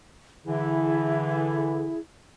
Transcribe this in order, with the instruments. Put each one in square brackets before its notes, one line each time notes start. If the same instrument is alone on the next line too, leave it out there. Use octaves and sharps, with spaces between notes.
[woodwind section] D3 E3 [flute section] E4 G#4